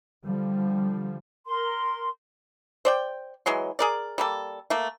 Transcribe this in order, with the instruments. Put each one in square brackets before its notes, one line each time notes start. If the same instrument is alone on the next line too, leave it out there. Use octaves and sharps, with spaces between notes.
[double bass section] D3 F3 G3
[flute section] A#4 C6
[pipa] C5 D5 G5
E3 F#3 G#3 C6
G#4 A#4 D5
G3 A#3 A4
A3 A#3